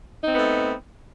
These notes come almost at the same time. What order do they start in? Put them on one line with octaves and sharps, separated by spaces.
D#4 C4 B3 A3